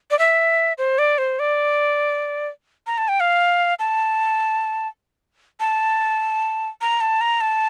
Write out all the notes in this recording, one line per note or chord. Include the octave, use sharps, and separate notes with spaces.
D5
E5
C5
D5
C5
D5
A#5
A5
G5
F5
A5
A5
A#5
A5
A#5
A5